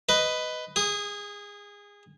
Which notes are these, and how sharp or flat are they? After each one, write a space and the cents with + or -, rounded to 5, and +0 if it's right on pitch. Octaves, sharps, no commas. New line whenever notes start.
B4 +10 D#5 +5
G#4 -25 D#6 +0